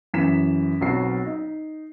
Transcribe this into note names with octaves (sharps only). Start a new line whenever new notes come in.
F#2 E3 B6 E7
B1 F#3 B3 C4 F#4 C7
D#4